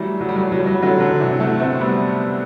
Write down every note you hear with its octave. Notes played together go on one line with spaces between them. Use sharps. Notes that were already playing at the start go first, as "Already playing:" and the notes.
Already playing: E3 F#3 G3 A3
F#3
G3
F#3
G3
F#3
G3
F#3
G3
D3 F#3
D3 F#3
C3 E3
F#3 A3
A3 C4
G3 B3